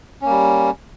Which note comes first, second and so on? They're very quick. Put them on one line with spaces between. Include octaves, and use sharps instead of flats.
C#4 A#3 G3